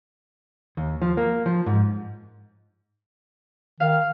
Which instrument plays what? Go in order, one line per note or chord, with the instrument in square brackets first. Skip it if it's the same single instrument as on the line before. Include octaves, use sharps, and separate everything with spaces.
[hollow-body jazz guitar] D#2
F3
A#3
F3
G#2
[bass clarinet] D#3 [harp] F5